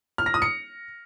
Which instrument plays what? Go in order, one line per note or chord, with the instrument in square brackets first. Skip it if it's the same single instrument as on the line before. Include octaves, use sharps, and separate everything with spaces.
[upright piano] F6
A#6
D#6
C#7